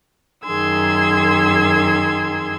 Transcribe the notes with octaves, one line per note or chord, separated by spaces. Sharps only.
F#2 D#3 G#4 C6 E6 G#6